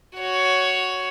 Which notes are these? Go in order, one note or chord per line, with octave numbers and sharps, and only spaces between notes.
F#4 C#5